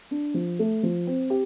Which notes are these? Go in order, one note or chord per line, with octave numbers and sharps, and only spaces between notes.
D4
F3
A3
F3
C4
G4